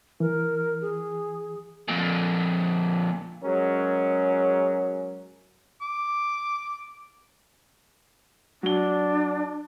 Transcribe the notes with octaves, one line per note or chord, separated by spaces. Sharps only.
E3 A#4
G#4
F2 A#2
F#3 G#3 C#4 G#4 A#4
D6
F#3 D4 G7